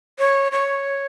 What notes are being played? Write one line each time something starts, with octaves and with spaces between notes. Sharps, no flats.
C#5
C#5